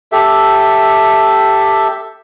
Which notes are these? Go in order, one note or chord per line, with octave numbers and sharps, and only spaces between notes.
G4 A4 E5